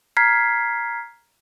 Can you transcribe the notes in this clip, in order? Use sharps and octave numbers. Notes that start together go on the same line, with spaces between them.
A#5 F6 G#6 B6 C7